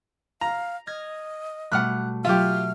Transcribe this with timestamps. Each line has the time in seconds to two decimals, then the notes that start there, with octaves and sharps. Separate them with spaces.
0.41 F5 A#5
0.87 D#5 F6 G#6 A#6
1.72 B2 G3 A3 F#5 F6 F#6
2.25 F#3 F4 G4 E5 F6